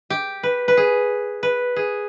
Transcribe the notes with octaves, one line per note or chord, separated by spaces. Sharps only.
G4
B4
B4
G#4
B4
G#4